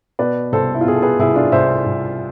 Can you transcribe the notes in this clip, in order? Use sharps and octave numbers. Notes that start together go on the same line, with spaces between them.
B2 B4 D5
C2 A4 C5
E4
F4
B2 G#4
A4
G#4 B4
C2 E4 G#4
D4 F4
C2 C5 E5
C2